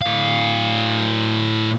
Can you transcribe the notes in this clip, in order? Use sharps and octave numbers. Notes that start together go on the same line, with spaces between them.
A2 F5